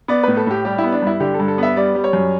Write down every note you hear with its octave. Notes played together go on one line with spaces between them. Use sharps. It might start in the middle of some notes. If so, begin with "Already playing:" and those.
B3 D5
A2 B4
A4
A2 G4
G3 G4
B3 E4
D4
G2 E4
D3 G4
A4
G2
A4
B3 E5
G3 D5
G3
C#5
F#2